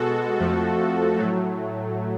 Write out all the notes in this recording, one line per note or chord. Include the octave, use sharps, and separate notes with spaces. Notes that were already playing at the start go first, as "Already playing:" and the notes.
Already playing: B2 G#3 F#4 A4
F2 F3 A3
A2 F#3 A3